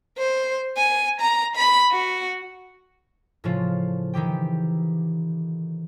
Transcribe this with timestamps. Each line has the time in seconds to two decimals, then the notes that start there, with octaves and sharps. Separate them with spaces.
0.18 C5
0.77 G#5
1.20 A#5
1.56 B5
1.92 F#4
3.44 A2 C#3 F3 F4
4.14 D#3 E3 G4 G5